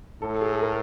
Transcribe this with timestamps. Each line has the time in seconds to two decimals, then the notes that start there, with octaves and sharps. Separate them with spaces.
0.22 A2 A4
0.41 G#4
0.52 A4
0.62 A#4